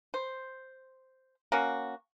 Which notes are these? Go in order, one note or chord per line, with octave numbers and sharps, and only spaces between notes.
C5
A#3 C#4 F#4